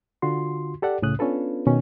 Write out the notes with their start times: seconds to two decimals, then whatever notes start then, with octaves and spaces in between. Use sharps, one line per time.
0.22 D3 F4 F#4 C6
0.82 G4 A4 D5 F#5
1.02 C2 A2 C#3 C#4 D#6 F#6
1.19 B3 C#4 D4 F4 A4 B4
1.67 B2 D#3 C#4